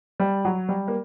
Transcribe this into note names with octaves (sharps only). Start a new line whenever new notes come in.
G3
F#3
G3
A#3